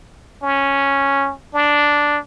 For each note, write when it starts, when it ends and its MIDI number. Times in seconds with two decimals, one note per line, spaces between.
0.43 1.33 61
1.54 2.19 62